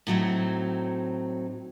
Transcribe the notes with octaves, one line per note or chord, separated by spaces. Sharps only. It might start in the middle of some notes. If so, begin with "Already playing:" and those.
A2 F#3 C4 D#4